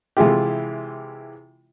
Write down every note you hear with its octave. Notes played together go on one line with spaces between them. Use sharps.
C3 E3 G#3 E4 F4 G4